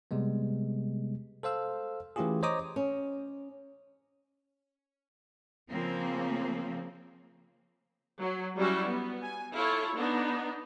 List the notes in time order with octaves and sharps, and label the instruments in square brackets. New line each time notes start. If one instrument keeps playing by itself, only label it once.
[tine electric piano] C3 G3 G#3 B3
A4 C5 F5 E6
E3 A3 C#4 F4 G4 G#4
C5 C#5 D#5 A#5 D6 D#6
[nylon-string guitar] C#4
[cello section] C#3 F3 A#3 C4
[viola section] F#3
F#3 G3 C#4 E4 F#4
B3
G#5
E4 F4 A4 C#5
B3 D4 D#4